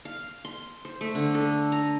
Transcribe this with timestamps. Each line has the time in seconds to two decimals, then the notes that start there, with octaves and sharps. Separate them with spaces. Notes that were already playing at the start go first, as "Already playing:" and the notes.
0.05 F5
0.45 C6
0.85 C5
1.01 A3
1.15 D3
1.35 A4
1.72 A#5